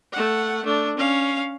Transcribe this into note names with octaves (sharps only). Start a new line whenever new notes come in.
A3 F#5
A3 D4
C#4 F5